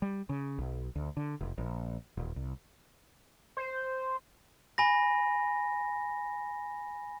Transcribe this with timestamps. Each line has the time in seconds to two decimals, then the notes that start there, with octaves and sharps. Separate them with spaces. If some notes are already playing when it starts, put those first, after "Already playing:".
0.02 G3
0.29 C#3
0.58 B1
0.96 D2
1.17 D3
1.41 F1
1.58 A#1
2.17 D#1
2.36 C2
3.57 C5
4.78 G#5 B5 A#6